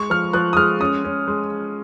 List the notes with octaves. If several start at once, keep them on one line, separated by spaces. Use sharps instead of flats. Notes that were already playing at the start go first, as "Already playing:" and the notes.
Already playing: G#3 C#6
F3 F6
F3 F#6
D#6
G#3 F6
C#4 D#6
C#4
G#3